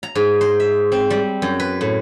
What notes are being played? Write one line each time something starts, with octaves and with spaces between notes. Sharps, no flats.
A#5
G#2
C5
E5
C4
G3
F#2
B4
A2